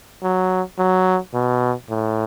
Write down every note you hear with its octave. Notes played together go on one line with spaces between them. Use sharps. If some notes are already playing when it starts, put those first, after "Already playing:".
F#3
F#3
B2
A2